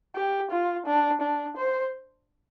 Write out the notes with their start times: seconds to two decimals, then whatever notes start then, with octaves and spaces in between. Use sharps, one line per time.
0.15 G4
0.51 F4
0.86 D4
1.21 D4
1.57 C5